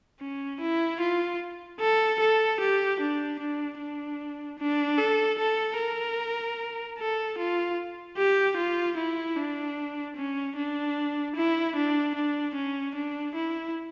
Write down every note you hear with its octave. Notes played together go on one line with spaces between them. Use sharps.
C#4
E4
F4
A4
A4
G4
D4
D4
D4
D4
A4
A4
A#4
A4
F4
G4
F4
E4
D4
C#4
D4
E4
D4
D4
C#4
D4
E4